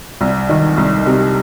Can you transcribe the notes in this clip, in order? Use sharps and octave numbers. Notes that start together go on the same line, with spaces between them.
C2
D#3
C2
C3